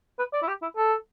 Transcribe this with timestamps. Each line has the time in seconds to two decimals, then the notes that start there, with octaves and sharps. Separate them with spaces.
0.19 B4
0.33 D5
0.42 E4
0.48 G4
0.62 E4
0.76 A4